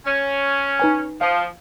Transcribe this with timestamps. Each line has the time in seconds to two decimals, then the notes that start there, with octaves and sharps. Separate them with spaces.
0.06 C#4
0.80 D#4 B4 G#5
1.21 F3 F5